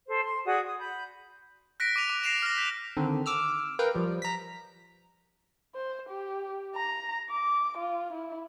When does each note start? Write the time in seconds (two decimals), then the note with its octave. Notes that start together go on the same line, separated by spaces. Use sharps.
0.07 A4 C5
0.25 C6
0.45 F#4 G#4 D5 D#6
0.67 D#6
0.79 B5 G6
1.80 F#6 A#6 B6 D7
1.96 D6 D#7 F7
2.09 D6
2.24 A#6 C7 D7 E7 F7
2.42 F6 A#6
2.56 G6 B6
2.97 D3 D#3 C4
3.26 D6 E6 F6
3.79 A#4 B4 F5 G5
3.95 F3 G3
4.22 A#5 B6
5.75 C5
6.09 G4
6.75 A#5
7.30 D6
7.78 F4
8.13 E4